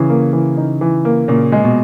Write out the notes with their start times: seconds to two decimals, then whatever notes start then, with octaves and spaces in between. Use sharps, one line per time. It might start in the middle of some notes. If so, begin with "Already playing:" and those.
Already playing: C#3 E3
0.09 A#3
0.33 E3
0.57 D#4
0.81 E3
1.05 A#3
1.28 A#2 C#3
1.52 G#3
1.65 B2